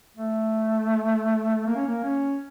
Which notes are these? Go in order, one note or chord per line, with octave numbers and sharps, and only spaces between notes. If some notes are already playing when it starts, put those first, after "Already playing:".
A3
A#3
C#4
A#3
C#4